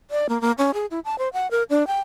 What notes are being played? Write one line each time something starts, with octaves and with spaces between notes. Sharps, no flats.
D5
A#3
A#3
C#4
G#4
E4
A5
C5
F#5
A#4
D4
G5